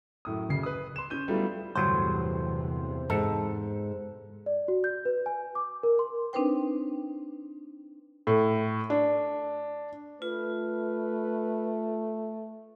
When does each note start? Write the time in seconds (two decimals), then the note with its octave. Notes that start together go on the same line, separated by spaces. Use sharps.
0.25 F#2 A2 D#6
0.49 F#1 C#3 C7
0.63 B4 D#6
0.96 C6 E7
1.10 C#4 G6 D#7
1.28 F#3 G3 A3 B3 E4 F4
1.75 G1 E2 A2 C3 F#3 C5
3.10 G#2 A4
4.46 D5
4.68 F#4
4.84 G6
5.05 B4
5.26 G#5
5.55 D6
5.83 A#4
5.99 C6
6.33 C4 D4 D#4 B4 C5 G5
8.27 A2
8.90 D4
10.22 A3 F4 B4